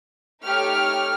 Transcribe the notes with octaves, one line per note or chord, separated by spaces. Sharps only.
A3 D#4 G4 C#5 F6